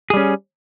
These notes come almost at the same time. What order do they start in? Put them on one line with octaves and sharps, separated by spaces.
G#4 G3 C#4